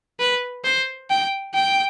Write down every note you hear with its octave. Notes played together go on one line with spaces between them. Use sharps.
B4
C5
G5
G5